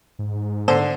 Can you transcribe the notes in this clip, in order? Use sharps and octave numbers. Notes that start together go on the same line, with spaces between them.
G#2
D3 C5